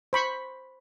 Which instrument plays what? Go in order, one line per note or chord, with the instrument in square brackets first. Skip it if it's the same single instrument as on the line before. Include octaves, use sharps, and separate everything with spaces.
[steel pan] C5 B5 C#6